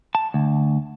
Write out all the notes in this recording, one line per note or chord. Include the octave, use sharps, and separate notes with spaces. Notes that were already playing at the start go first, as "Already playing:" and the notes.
A5
D2